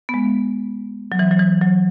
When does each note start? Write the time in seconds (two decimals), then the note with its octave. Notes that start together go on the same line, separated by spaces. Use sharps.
0.09 B3
0.14 G#3
1.12 F#3
1.19 E3
1.31 F#3
1.40 E3
1.61 F#3